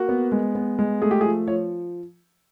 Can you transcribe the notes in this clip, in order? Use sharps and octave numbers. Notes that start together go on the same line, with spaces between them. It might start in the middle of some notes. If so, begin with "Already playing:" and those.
Already playing: A#3 F#4
B3
G#3
B3
G#3
A3 G#4
G4
G#4
F3
F3 C#5